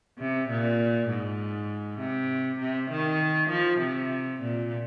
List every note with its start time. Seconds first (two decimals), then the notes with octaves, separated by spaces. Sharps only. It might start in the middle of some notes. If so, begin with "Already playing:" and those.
0.19 C3
0.49 A#2
1.09 G#2
2.00 C3
2.60 C3
2.90 D#3
3.50 F3
3.80 C3
4.41 A#2